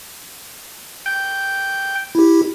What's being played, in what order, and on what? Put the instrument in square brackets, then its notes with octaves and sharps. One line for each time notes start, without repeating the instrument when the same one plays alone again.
[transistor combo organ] G5
[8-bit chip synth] E4 G4